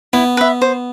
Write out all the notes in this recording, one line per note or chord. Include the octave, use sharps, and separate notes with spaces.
B3 E4
B4 E5
C5